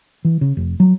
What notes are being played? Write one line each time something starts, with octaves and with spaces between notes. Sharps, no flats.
E3
C#3
F1
F#3